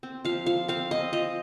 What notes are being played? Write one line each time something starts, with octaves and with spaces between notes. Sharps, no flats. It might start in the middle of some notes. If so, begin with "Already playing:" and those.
C4
F3 F5
F3 F5
C4 F5
C4 D#5
F3 D#5